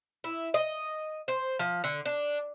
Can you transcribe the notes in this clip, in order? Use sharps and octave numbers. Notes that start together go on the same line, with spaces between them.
E4
D#5
C5
F3
D3
D4